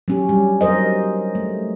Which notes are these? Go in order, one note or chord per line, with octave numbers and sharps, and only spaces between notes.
F#3 C#4 G4
G3
F#3 A#4 C5 D#5
A3